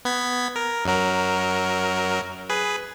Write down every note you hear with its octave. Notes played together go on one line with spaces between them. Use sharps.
B3 G#6 B6
A#4
F#2 F#3 A#4
G#4 B4